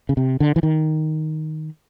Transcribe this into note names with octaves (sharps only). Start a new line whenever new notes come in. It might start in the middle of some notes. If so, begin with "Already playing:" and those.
C#3
C3
D3
E3
D#3